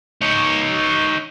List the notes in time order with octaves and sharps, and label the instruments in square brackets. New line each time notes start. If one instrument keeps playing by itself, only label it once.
[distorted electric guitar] D#4 C#5